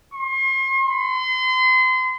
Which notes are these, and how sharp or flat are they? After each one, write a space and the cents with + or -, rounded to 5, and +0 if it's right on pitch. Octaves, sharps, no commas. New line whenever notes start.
C6 +40
C6 -35